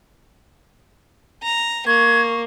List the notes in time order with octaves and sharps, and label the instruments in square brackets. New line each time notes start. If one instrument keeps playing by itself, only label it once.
[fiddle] A#5
[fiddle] A#3 [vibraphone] C#6 [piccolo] G#6